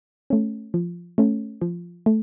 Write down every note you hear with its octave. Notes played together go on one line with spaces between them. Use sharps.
A3 C#4
F3
A3 C#4
F3
A3